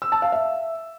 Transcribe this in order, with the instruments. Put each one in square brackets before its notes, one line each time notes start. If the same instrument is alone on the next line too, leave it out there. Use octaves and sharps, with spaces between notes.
[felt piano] E6
A5
F5
E5